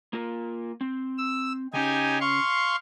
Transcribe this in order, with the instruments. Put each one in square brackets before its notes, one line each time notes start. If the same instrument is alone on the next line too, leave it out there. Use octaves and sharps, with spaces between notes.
[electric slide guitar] A#3 F4 A#4
C4
[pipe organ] E6
[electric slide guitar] C#3 C#4 [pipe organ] D#4 G4 G#5
[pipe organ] F5 C6 C#6